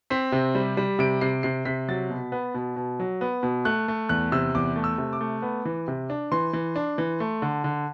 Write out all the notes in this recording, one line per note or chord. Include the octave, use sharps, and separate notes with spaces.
C4 B6
C3
G3
G3
C3 D7
C3 C7
C3 C7
C3 B6
F#3 A6
B2
B3
B2
B2
F#3
B3
B2
A3 F#6
A3
E2 F#6
C3 E6
E2 D6
A3
E6
C3
D6
A3
B3
E3
C3
D4
E3 C6
E3
D4
E3
A3
D3
D3